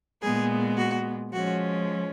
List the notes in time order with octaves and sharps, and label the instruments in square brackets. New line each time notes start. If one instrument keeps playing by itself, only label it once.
[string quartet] A#2 G#3 B3 G#4
F#4
F3 G#3 C#4 F#4